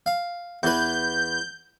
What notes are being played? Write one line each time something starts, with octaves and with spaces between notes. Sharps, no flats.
F5
E2 B4 G6